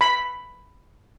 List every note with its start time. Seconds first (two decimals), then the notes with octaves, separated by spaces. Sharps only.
0.01 B5